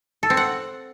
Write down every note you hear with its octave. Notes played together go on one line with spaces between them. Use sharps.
A4
C4
F#5